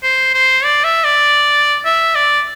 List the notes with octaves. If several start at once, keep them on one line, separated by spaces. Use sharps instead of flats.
C5
C5
D5
E5
D5
E5
D5